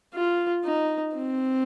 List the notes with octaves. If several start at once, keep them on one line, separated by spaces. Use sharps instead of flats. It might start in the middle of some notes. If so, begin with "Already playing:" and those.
F4
D#4
C4